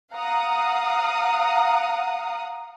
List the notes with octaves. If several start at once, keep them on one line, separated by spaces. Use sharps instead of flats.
F5 F#5 A#5 D#6